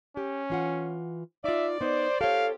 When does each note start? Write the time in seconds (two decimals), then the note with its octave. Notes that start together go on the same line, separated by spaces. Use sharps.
0.17 C#4 G4
0.50 E3 F4 F#5
1.44 D#4 F4 D5 E5
1.81 B3 D#4 C5
2.21 C4 F4 G4 A4 C#5 F5